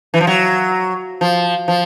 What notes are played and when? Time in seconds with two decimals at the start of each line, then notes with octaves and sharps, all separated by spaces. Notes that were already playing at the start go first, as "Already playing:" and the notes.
0.14 E3
0.21 F3
0.27 F#3
1.21 F3
1.68 F3